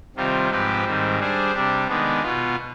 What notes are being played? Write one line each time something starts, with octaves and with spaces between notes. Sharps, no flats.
C3 D#3 G3 C4 F4
G#2 F3 C4 G4 B4
G#2 D#3 G3 C4
G3 D4 G#4 C5
C3 G3 D4 G4
D#3 G#3 B3 D4
B2 B3 F4